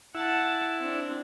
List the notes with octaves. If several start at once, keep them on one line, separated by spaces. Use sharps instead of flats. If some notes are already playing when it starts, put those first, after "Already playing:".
E4 F#5 A5
C4 D4